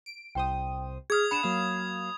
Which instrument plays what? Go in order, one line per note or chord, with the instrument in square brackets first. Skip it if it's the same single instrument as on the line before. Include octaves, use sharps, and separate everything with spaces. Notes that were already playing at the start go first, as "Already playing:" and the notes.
[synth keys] D7
[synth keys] C2 C5 D#6 [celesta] G5
[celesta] G#4 F6 [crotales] D#6 G#6
[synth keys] D4 F#5 [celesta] B5 E7
[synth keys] F#3 A#3 F5